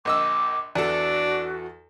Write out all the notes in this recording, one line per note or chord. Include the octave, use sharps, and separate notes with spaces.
A#1 D#5 D6 E6
E2 D4 F#4 A4